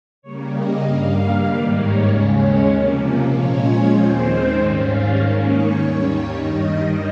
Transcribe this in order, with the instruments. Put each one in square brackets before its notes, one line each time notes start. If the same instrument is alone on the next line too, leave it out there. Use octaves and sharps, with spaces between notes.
[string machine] C#3 G3 A#3 C#5
D#5
G2 G3 A#3 F5
G#2 D#3 G3 A#3 G5
C#5
D#2 C#3 G#3 C#4 D#5
C#5
C3 F3 A#3
A#2 F3 G#3 C#4 C#5
D#2 D#3 G#3 C4 C5
G#2 D#3 G3 C#4 C5
F5
G#2 D#3 A#3 C#4 D#5
C#5
D#2 D#3 G3 C#5
G2 D#3 G3 D#5